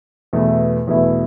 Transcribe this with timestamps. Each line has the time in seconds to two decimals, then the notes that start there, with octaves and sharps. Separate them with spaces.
0.33 E2 B2 A3 E4
0.87 E2 B2 A3 E4